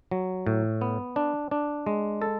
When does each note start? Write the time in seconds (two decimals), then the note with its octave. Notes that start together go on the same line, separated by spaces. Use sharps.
0.11 F#3
0.47 A2
0.81 B3
1.16 D4
1.51 D4
1.86 G#3
2.22 A4